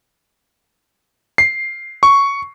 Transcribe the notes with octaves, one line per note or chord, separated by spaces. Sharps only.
C7
C#6